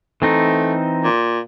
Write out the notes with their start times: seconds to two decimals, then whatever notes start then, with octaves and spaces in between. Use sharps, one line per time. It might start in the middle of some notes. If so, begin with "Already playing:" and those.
0.22 E3 A3 C4 D#4
1.04 A#2